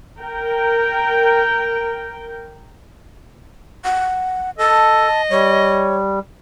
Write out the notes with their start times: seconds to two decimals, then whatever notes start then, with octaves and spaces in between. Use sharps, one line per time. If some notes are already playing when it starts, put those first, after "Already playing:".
0.20 A#4 G5
3.84 F#5
4.59 A4 D#5 A5
5.30 G3 C#5